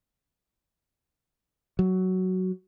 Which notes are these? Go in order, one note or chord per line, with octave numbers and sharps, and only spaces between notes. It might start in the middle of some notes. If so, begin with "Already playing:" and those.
F#3